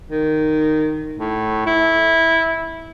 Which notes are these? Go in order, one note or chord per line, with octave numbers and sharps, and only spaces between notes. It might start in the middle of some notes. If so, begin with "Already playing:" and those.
D#3
A2
E4